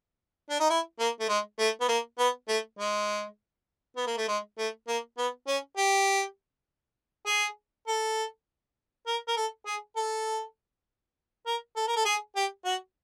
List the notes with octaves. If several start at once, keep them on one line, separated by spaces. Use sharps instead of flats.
D4
D#4
E4
A#3
A3
G#3
A3
B3
A#3
B3
A3
G#3
B3
A#3
A3
G#3
A3
A#3
B3
C#4
G4
G#4
A4
A#4
A#4
A4
G#4
A4
A#4
A4
A#4
A4
G#4
G4
F#4